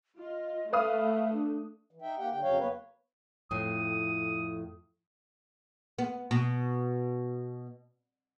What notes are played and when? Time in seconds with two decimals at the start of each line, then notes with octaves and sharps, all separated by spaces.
0.20 F4 D#5
0.73 A3 B4 E5 F5 D#6
1.33 D4
1.91 E3
2.02 D#4 E5 G5
2.18 A#3 G4 F#5 G5
2.31 D3 G5
2.42 F2 C#3 F#3 C#5 F5 G5
2.58 A#3 B3 B4 C#5
3.51 F2 A2 D#6
5.98 B3
6.31 B2